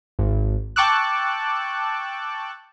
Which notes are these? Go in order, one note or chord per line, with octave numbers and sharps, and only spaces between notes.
G#1
G5 A5 C#6 D6 E6 F#6